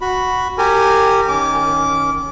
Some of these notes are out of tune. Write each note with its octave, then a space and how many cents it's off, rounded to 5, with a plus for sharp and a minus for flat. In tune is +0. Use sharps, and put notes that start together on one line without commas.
F#4 +0 B5 +0
G4 +0 A#4 -25 G#5 +0
D#3 +0 C#4 +5 D6 -20